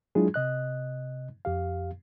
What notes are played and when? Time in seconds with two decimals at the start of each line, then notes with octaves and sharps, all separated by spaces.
0.15 F#3 G#3 D4 E4 F4 G#4
0.34 C3 D#5 F#6
1.45 F2 G4 F5